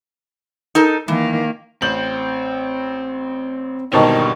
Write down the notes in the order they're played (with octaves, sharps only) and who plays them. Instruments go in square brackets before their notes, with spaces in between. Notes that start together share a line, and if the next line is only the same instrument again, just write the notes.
[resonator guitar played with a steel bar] D#4 A4 A#4
[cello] D#3 A#3 [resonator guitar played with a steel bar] E3
[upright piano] A1 G6 F#7 [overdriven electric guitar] C4
[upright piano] G#1 B2 A5 [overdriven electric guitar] D3 G3 [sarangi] D#3